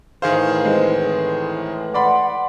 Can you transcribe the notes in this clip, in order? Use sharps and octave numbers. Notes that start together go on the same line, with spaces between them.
A2 D#3 E3 G#4 C5 F5
G#3 C4
D5 F#5 B5 C6